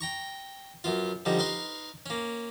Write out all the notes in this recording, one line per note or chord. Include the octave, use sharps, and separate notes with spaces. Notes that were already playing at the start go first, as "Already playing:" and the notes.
G5 A#5 C#6
F#2 B3 F4
D3 F3 G3 D#4
D#4 B4 F5 C6
A#3 C#4